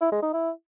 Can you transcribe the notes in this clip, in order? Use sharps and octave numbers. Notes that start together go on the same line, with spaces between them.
E4
G#3
D#4
E4